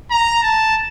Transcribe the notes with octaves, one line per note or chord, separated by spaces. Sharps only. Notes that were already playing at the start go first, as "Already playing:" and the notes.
A#5
A5